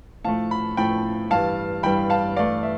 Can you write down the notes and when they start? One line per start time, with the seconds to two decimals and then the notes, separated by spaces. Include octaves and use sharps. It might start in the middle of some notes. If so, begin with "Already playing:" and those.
0.24 A2 F3 A3 F5 A5
0.51 B5
0.77 A2 F3 A3 G5 B5
1.30 G2 E3 G3 F5 A5
1.83 G2 E3 G3 G5 B5
2.10 F5 A5
2.36 G2 E3 A3 D5 F5
2.63 E5